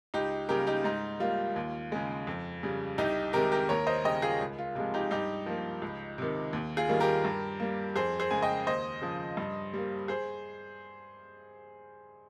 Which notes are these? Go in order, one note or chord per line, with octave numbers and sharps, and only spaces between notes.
C#2 D#4 G4
C#3 G3 A#3 G4 A#4
D#4 G4
G#2 D#4
G3 A#3 F4
D#2
C#3 G#3
F2
C#3 G3
C2 D#4 G4
C3 D#3 G#3 G4 A#4
G4 A#4
D#2 A#4 C#5
C5 D#5
C#3 G3 D#5 G5
F4 G#4
C#2
F4
C3 F3 G#3 F4
D#4 G4
G2 D#4 G4
F3 A#3
C#2
C3 D#3
D#2
F4 G#4
D#3 G3 A#3
G4 A#4
G2
G3 A#3
F2 G#4 C5
G#4 C5
C#3 G#3 G#5
D#5 G5
D#2 C5 D#5
C#3 F3
G2
G3 A#3
G#4 C5